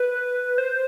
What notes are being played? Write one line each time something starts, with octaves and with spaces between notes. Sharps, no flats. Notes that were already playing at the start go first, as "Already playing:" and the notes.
Already playing: B4
C5